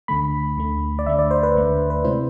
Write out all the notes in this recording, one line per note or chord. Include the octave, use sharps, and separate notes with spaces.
D2 D3 A3 B5
D2 D3 A3
D5
D2 D3 A3 E5
D5
C5
B4
D2 D3 A3
B4
C3 G#3 C4 E4 C5